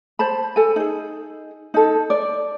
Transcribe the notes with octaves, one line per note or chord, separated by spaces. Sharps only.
C5 A5 B5
A4 G#5
D#4 G#4
D#4 A4
D5